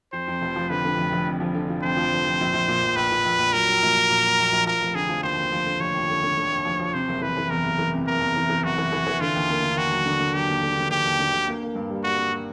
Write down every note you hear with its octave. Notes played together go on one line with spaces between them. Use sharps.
F2 C5
F2
F1
F3
D3 B4
D3
F1
F1
F2
F3
D3
F3
F2 C5
F3
F1
F2
A#1
A#1
A#2
A#1
A#1 B4
A#2
A#1
A#1
F#3 A#4
F#3
A#1
A#1
A#2
F#3
A#1
A#1
F3 A#4
F1
D3 G#4
F3
D#2 C5
D#2
F3
D3
F1 C#5
D#2
D3
D3
D3
D#2
F3
F3
C3 C5
F#1
E3 B4
E3
E2 A#4
F#1
E3
C3
F#1 A#4
E2
E3
E3
F#1 F#4
E3
E3
E3
D3 F4
D#2
A#3
D3
D#2 F#4
F#3
D3
D3
F#3 G4
D#2
D3
D3
D#2 G4
D#2
D3
D3
A#3
A#3
G2
G3
G3 F#4
A#3
G3